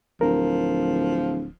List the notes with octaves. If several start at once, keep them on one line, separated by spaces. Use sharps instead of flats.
D1 F3 A#4